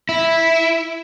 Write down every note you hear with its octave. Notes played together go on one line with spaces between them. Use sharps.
E4